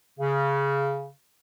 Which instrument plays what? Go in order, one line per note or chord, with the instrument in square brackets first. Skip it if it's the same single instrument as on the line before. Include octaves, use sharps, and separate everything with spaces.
[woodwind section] C#3